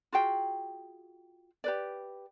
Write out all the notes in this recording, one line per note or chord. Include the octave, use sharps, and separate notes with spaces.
F4 F#4 G#4 G5
G4 B4 D5